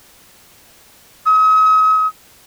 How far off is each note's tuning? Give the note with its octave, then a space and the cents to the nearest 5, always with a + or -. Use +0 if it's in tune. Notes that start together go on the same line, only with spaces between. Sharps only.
D#6 +40